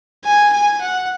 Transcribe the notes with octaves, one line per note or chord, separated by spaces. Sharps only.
G#5
G#5
F#5